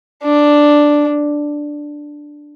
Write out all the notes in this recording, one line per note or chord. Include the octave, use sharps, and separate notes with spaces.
D4